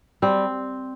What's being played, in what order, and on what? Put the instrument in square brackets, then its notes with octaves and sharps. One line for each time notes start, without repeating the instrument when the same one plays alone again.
[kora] G3 C4